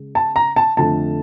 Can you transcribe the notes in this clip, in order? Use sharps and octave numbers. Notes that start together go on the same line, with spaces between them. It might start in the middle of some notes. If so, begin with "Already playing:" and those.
Already playing: C#3 G#3
A5
A#5
A5
F2 D3 F3 A3 A5